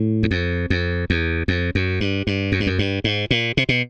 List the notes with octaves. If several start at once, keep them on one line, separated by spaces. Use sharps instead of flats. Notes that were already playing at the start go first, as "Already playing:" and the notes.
Already playing: A2
E2
F2
F2
E2
F2
F#2
G2
G2
F#2
G2
F#2
G2
G#2
A#2
C3
B2